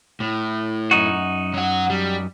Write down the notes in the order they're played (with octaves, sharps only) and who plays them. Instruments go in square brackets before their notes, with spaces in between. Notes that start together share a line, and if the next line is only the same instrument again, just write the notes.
[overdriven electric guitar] A2
[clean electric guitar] F#2 D#4 F#4
[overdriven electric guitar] F#3 F#5
G3